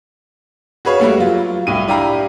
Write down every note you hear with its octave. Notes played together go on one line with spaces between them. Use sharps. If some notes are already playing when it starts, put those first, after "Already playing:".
F#4 G#4 B4 C#5 F5
G3 A3 A#3 F#4
F#3 F4
C2 A2 D#7
D4 E4 G4 F5 A#5 B5